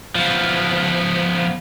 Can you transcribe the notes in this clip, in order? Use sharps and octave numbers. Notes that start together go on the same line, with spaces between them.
F3 B3